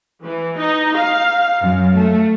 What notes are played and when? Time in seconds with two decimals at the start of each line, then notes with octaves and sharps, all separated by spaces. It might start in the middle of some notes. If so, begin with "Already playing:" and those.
0.23 E3
0.58 D#4
0.96 F5
1.62 F#2
1.97 A3